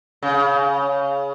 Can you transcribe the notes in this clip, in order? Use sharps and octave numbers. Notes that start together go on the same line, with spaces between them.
C#3